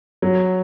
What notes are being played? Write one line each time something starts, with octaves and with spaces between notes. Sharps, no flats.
F#3